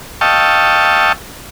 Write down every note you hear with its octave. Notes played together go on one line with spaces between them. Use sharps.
D#5 F5 G5 A5 C#6 E6